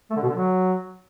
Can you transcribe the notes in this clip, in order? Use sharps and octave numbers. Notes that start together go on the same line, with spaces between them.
A3
D3
B2
D3
F#3